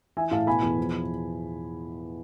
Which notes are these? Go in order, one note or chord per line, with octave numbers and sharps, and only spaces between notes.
E3 E5 G#5
A2 F5 A5
B2 G#5 B5
E2
F3